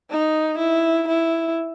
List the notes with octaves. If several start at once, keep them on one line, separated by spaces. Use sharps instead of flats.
D#4
E4
E4